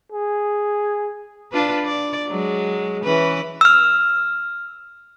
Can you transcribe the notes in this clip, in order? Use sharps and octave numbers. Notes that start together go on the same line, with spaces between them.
G#4
D4 F4 B4
D5
F#3 G#3
E3 C#4 B4
E6 F6